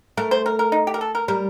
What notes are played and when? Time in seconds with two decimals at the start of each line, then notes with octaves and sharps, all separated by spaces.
0.17 A3 A#4
0.31 C5
0.46 A#4
0.59 A#4
0.72 D#4
0.87 G4
0.94 A#4
1.01 A4
1.15 A#4
1.28 G3 A#4